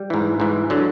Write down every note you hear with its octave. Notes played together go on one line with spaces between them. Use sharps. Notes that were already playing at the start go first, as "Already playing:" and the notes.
Already playing: G3
G#2 E3
G#2 E3
D3 F#3